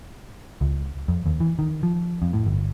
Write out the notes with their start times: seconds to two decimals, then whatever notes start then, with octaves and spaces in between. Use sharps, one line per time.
0.61 C#2
1.08 F2
1.26 D#2
1.40 E3
1.59 D#3
1.83 F3
2.22 F2
2.33 A2
2.46 G1